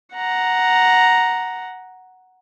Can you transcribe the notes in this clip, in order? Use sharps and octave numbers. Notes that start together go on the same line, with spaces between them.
F#5 A#5